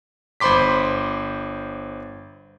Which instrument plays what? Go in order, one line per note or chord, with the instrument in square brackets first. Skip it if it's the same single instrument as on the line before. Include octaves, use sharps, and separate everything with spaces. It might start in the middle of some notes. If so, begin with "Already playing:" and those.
[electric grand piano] G1 C5 B5 C6 D6 B6